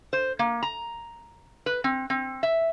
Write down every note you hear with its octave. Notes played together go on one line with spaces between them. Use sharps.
C5
A#3
A#5
B4
C4
C4
E5